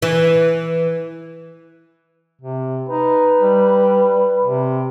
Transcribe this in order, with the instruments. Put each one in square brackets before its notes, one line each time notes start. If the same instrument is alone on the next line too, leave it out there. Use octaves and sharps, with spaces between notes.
[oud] E3
[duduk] C3
[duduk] D#4 [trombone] B4
[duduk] G3
C3